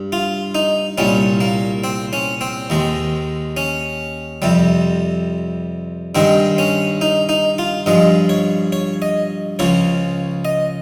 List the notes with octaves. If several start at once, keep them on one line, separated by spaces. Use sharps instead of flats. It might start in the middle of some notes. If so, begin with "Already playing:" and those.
Already playing: G2
F4
D#4
C2 A#2 G3 C#4
A#3
C4
C#4
C4
D#2 D#3 G#3
C#4
F2 C3 G3
G2 D#3 G#3 C4
C#4
D#4
D#4
F4
G2 F3 G#3 D#5
C#5
C#5
D#5
C#2 C#3 F3 C#5
D#5